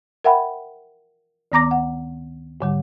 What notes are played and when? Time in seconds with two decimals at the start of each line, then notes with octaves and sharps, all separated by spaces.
0.24 A#4 E5 F#5 G5 B5
1.52 D2 D#3 B3 A#5 D6 A#6
1.71 F#5
2.61 G#2 D3 G3